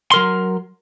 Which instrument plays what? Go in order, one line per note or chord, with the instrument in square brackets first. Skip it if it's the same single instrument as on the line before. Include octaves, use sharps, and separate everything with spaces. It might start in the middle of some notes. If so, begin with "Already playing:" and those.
[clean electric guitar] F#3 A#4 C6